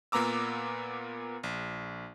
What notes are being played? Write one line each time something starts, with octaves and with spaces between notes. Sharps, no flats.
A#2 A#3 B3 A#5 D6 E6
A#1